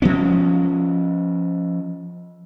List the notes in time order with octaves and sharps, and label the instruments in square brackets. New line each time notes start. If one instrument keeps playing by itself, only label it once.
[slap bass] F3 B3 C#4